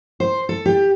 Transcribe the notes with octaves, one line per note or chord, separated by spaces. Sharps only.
C5
A4
G4